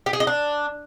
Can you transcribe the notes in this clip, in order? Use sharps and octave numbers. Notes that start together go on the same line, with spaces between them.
G4
G#4
D#5
D4